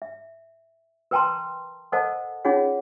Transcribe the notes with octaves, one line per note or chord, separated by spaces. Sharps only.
E5
A#4 B4 G5 A5 A#5 C6
A4 A#4 C5 D#5 F#5 A5
C#4 D#4 F4 G#4 C#5 F#5